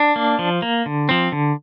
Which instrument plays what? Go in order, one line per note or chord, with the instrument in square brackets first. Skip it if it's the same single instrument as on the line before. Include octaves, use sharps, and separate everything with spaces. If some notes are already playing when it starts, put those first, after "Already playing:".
Already playing: [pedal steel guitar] D4
A#3
F3
A#3
D3
F3 C4
D3